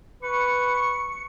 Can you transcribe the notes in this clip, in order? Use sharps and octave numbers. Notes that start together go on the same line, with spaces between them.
B4 C#6 C#7